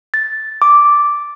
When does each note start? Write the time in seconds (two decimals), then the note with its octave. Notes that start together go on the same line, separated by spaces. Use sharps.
0.14 A6
0.62 D6